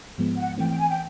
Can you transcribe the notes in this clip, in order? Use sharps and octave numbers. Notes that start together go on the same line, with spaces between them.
G#2 F3 G#3 B3
F#5
E3 A3 C4 G5
G5
G#5
G5